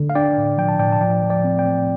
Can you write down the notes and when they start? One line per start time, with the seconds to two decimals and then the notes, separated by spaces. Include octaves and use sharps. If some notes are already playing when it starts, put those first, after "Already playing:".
Already playing: D3
0.10 F5
0.15 D4 D5 G5
0.37 A2
0.58 F3 G5
0.69 A5
0.79 A2 D5 G5
0.93 A5
1.01 F3 D5 G5
1.23 F3
1.30 D5 G5
1.44 C4
1.58 D5 G5
1.66 C4